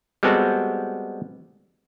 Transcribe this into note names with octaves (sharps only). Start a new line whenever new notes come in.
G3 G#3 B3 C4 F#4 A4